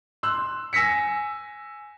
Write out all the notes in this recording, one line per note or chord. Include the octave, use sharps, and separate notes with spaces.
C6 E6 F#6
G#5 E6 A#6 B6 C#7